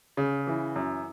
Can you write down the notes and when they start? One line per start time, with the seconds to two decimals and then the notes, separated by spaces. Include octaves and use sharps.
0.17 C#3
0.47 E3
0.76 F#2